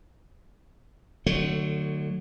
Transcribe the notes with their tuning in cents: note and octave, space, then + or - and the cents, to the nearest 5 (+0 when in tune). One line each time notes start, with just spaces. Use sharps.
D3 +35 F#3 +0 A3 +15